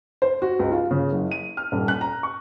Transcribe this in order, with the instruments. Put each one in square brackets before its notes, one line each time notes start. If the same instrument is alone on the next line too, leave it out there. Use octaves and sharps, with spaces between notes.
[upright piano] C5
F#4
C#2
F4
C#3
F#1
D#7
F6
D#1
F#6
A#5
C#6